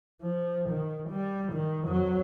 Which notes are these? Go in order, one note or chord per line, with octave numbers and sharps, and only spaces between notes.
F3
D#3
G3
D#3
F2 F#3